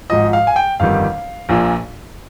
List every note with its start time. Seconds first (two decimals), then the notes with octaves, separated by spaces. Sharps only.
0.10 G#1 G#2 F3 D#5
0.33 F5
0.47 G#5
0.56 G5
0.80 G1 F2 D#3 G3 F5
1.49 A#1 A#2 F3